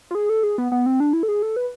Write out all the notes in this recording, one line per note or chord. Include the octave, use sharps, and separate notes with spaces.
F4
G#4
A4
G#4
B3
B3
C4
D4
E4
A4
G#4
A4
B4